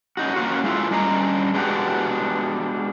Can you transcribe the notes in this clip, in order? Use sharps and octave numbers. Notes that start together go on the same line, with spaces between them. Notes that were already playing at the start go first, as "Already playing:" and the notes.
C#4 D#4 F#4
A#3 C#4 F4 F#4
G#3 A3 E4 F4
G3 C#4 D4 D#5 G5 A#5
G#3 B3 D4 E4 F#4 G4